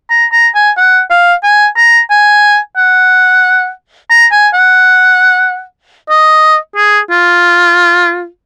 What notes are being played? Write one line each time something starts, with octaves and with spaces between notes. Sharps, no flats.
A#5
A#5
G#5
F#5
F5
G#5
A#5
G#5
F#5
A#5
G#5
F#5
D#5
G#4
F4